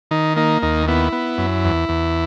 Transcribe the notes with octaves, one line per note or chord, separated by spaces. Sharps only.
D#3 D#4
A#3 D#4
D#2 D#4
B3 E4
B3
F#2
E2
E2